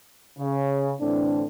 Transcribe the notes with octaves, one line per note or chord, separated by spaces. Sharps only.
C#3
A2 D3 E3 C4 D4